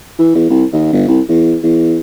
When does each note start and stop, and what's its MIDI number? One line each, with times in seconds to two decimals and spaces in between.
0.19 0.32 52
0.35 0.45 40
0.50 0.64 36
0.72 0.91 39
0.93 1.03 31
1.08 1.20 36
1.28 1.56 40
1.63 2.00 40